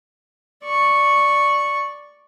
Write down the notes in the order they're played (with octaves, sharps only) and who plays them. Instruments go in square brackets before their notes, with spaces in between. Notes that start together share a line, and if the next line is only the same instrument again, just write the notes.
[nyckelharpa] D5 C#6